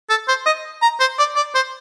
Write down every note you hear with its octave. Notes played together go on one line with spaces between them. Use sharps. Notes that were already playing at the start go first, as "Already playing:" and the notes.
A4
C5
D#5
A#5
C5
D5
D5
C5